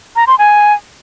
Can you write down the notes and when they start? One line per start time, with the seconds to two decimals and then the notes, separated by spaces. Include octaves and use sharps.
0.16 A#5
0.27 C6
0.39 G#5